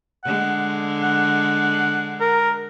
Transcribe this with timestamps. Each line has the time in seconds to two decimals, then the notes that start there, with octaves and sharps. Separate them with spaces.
0.24 D3 G#3 F#5
1.04 F#5
2.20 A#4